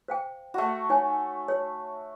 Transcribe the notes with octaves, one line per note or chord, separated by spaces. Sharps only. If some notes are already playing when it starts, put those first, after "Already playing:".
C5 F5 G5
A3 F#4
D#4 C#5 G#5
C#5